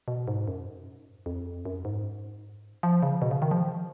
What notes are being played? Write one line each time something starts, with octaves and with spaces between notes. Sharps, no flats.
B2
G#2
F#2
F2
F#2
G#2
F3
C#3
B2
C#3
D#3
F3